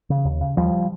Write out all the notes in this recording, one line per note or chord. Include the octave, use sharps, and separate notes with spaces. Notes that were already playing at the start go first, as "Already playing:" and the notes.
C#3
D#2
C#3
D#2 F3 G3